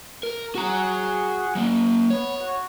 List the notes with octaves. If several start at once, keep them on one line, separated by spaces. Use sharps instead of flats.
A#4
F#4 G#4 F#5 A#5
F#3 A#3
B3 C#5
F#4